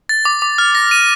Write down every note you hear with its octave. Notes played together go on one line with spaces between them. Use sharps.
A6
D6
D6
F6
A#6
D#7